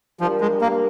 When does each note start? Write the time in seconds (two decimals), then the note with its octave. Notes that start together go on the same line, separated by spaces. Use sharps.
0.20 F3 G3 D4 G4 A#4
0.41 G#3
0.61 A#3